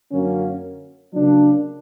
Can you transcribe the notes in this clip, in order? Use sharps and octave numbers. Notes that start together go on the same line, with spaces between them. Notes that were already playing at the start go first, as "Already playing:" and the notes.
F#2 D3 F#3 A#3 C#4
C#3 F#3 A#3 D4